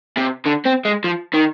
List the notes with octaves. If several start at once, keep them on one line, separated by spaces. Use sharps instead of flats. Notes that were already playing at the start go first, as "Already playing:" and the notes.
C3
D3
C4
G#3
F3
D#3